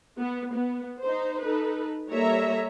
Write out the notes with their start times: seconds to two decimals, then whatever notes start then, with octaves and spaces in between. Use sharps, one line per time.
0.18 B3
0.54 B3
1.01 D#4 C5
1.42 D#4 A4 B4
2.09 G3 A#3 A4 C#5 E5 A#5